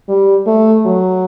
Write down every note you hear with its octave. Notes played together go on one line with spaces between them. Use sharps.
G3
A3
F#3